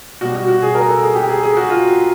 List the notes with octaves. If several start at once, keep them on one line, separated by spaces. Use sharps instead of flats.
B2 G3 F#4
F#4
F#4
G#4
A#4
A4
G#4
G4
G#4
G#4
F#4
F4